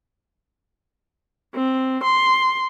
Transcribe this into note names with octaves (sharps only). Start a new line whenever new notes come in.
C4
C6